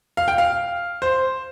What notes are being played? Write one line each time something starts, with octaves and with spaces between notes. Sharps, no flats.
F5
G5
F5
C5